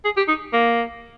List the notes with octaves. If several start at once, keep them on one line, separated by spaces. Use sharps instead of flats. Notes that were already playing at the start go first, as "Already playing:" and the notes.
G#4
G4
D#4
A#3